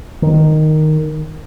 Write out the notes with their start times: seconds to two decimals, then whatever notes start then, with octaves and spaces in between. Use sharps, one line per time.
0.22 D#3